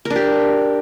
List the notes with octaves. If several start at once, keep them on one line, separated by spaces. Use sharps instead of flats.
A#4
D4
G4